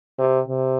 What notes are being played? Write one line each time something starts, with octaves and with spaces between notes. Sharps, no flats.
C3
C3